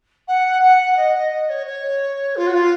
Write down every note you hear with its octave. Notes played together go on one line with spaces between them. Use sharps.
F#5
F#5
D#5
D#5
D#5
C#5
C#5
F4
F#4
F4